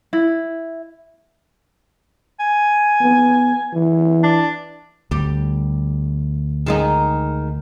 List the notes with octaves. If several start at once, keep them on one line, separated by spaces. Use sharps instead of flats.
E4
G#5
B3
E3
D4
D2 G3 G4
D#3 G#3 D#4